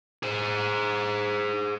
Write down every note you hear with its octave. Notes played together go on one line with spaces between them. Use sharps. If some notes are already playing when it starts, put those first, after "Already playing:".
G#4 C5